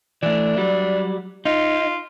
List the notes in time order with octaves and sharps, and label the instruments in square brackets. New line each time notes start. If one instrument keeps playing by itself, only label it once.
[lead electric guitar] E3 A3 [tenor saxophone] D4
[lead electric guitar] F#3 G3
[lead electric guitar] D#4 [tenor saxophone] F4